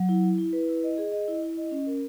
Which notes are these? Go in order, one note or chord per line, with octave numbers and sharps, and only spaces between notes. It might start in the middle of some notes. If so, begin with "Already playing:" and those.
Already playing: F#3
E4
E4
E4
B4
E4
D#5
G#4
D#5
E4
E4
D#5
C#4
A#4